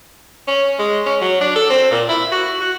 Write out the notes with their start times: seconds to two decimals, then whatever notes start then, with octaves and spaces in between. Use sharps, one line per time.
0.47 C#4
0.79 G#3
1.06 C#4
1.21 F#3
1.41 D4
1.56 A4
1.71 C4
1.91 A#2
2.09 E4
2.32 F#4
2.61 F#4